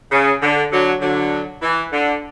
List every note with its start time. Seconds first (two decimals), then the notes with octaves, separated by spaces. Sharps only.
0.12 C#3
0.42 D3
0.72 D3 F#3
1.01 D3 F#3
1.62 E3
1.92 D3